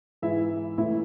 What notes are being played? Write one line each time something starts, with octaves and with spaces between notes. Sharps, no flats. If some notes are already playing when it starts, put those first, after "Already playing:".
G#2 E3 G#3 E4 E5
A2 E3 A3 E4 E5